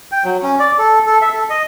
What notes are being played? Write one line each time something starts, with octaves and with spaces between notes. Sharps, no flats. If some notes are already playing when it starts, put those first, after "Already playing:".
G5
F#3
C#4
D5
A4
A4
E5
A4
D#5